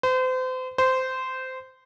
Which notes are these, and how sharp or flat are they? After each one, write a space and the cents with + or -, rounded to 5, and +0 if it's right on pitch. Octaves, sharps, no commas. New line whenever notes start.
C5 -35
C5 -15